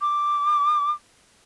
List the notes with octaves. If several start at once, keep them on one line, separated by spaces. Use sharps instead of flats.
D6